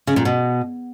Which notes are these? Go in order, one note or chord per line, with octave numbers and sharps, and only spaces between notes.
C#3
A#2
B2